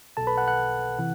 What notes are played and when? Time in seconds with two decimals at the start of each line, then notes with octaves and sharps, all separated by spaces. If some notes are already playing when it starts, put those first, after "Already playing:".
0.17 B1 B2 A4 A5
0.27 B4 B5
0.37 F#5 F#6
0.48 F#5 F#6
0.98 C3 E3